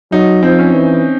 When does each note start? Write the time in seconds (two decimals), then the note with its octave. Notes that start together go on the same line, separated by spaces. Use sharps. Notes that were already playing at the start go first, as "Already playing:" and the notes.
0.12 F#3 D#4
0.43 F3 C4
0.59 C#4
0.74 E3